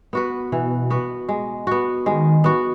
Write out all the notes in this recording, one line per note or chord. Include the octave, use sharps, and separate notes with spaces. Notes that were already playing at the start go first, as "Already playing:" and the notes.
B3 F#4 B4
B2 E3
B3 F#4 B4
G#3
B3 F#4
D#3 G#3
B3 F#4